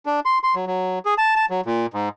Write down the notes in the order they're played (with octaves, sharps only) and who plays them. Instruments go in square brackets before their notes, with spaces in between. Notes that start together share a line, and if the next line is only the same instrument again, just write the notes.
[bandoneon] D4
C6
C6
F#3
F#3
G#4
A5
A5
F#3
A#2
G#2